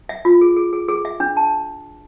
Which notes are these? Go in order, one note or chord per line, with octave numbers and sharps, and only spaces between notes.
E5
F4
G#4
G#4
G#4
G#4
E5
D4
A5